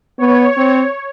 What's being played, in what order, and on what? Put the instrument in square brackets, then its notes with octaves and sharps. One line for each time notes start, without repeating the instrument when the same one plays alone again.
[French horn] B3 [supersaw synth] C#5
[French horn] C4